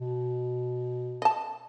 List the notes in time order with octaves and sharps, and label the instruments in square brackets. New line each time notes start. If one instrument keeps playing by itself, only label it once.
[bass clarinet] B2
[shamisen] D#5 A5